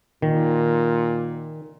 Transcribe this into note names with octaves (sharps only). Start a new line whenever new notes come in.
A#2 D#3